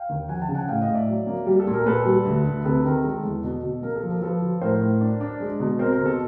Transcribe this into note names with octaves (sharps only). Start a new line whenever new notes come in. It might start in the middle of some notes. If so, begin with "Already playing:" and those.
Already playing: F5 G5
D#2
F3 F#5 G#5
G5 A5
C#3
F#5 G#5
A2 F5 G5
D#5 F5
A2
D5 E5
F#3
A#3
G3
A4
A#2
A#4
A#2 A4 B4
G3
D2
D2
C3 A4 B4
D#3 A#4
G#3 A4
E2
B2
B2
A#3 A#4
A4
F3
A#4
F3 A4 B4
F3
A2 A#4 C5
A2
D4
D4
G#3
B2
C4 A#4 C5
A#4
B2
A4